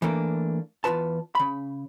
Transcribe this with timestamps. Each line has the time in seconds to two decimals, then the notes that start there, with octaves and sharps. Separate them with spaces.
0.02 E3 A3 A#3 D4
0.84 E2 G#2 F4 B4 A5
1.35 C#3 B5